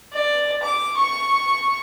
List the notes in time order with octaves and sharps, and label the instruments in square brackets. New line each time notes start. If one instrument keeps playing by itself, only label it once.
[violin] D5
D6
C#6